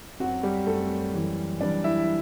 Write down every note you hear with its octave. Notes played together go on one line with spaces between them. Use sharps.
F#2 F#3 C4 F#4
G3 G4
F#2 F#3 A3 C4 A4
F#2 E3 G3
F#2 E3 G3 D4 D5
E4 E5